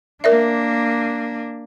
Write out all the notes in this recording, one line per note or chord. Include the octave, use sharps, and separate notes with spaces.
A#3 D4 A#4 D5 E5